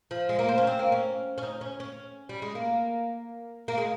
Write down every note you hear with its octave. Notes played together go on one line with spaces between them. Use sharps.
F3
G#3
A#3
C4
C#4
C4
A#3
C#4
C#4
D#4
C#4
C#4
G3
G#3
A#3
A#3
G#3